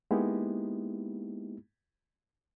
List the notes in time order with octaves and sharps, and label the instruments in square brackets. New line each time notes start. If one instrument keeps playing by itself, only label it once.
[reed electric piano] G#3 A#3 B3 D#4 E4 G4